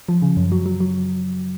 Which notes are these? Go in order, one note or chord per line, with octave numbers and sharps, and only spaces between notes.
F3
C#3
F#2
F#3
F#3
F#3